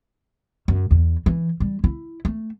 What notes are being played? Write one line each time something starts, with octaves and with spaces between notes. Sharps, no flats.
F#2
E2
E3
G3
E4
A3